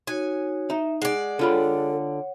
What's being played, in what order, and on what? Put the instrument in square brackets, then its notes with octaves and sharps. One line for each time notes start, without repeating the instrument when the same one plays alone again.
[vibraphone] D#4 F#4 C#5 [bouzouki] G#5
[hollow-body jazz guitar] D#4 [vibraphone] E5
[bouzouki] G#3 D5 [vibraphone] F#5
[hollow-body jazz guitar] D3 F4 B5 [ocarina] A4 [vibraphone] C#5 F#5